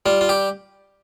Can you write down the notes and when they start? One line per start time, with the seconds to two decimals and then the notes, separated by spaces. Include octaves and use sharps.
0.06 G3 F4
0.21 F4
0.29 G4